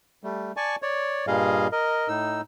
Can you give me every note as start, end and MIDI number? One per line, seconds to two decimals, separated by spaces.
0.24 0.52 55
0.24 0.52 57
0.57 0.76 74
0.57 0.76 80
0.57 0.76 81
0.57 0.76 85
0.82 1.26 73
0.82 1.26 74
1.27 1.67 43
1.27 1.67 46
1.27 1.67 55
1.27 1.67 68
1.27 1.67 75
1.27 1.67 77
1.72 2.08 70
1.72 2.08 75
2.08 2.41 45
2.08 2.41 63
2.08 2.41 88